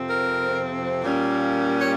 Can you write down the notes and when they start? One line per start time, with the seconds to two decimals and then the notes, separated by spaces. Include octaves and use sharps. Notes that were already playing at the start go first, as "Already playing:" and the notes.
Already playing: F2 C3 F3 C4
0.09 A#4
1.03 A#2 G3 A#3 C#4
1.79 C#5